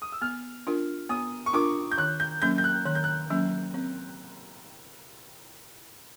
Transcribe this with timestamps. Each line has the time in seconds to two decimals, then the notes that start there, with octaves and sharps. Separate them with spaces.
0.02 D#6
0.12 E6
0.22 B3 F6
0.67 D4 F4 A#4
1.09 B3 D#6
1.46 C#6
1.53 D4 F4 A#4 D6
1.91 G6
1.98 D#3 F#6
2.20 G6
2.42 F#3 A#3 C#4 G6
2.58 G6
2.64 F#6
2.85 D#3 F#6
2.95 G6
3.04 F#6
3.30 F#3 A#3 C#4
3.74 C4